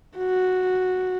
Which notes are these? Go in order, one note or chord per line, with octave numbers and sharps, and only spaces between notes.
F#4